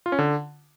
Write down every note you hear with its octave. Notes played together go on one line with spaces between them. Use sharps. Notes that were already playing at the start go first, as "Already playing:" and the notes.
F4
C#4
D3